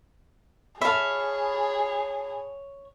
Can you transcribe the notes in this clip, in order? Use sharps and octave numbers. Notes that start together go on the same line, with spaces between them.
G#4 C#5 E5 F5 A5 B5